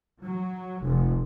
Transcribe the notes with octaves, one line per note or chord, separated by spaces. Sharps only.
F#3
F1